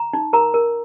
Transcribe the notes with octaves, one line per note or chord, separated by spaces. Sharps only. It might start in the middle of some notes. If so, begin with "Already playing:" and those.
Already playing: A#5
D#4
A#4 A#5
A#4